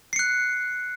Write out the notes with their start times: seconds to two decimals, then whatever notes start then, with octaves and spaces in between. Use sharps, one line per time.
0.13 C7
0.16 C#7
0.19 F#6